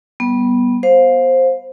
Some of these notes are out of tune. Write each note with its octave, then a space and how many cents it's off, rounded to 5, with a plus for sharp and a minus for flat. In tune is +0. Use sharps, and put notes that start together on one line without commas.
G3 -20 B3 -15
C5 +5 F5 +20